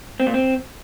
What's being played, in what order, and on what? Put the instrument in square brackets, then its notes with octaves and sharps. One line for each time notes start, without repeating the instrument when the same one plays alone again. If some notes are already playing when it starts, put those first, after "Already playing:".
[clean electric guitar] C4
A#2
C4